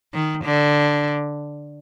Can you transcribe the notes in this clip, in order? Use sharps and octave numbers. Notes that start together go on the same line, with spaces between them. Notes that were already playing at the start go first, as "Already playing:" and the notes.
D#3
D3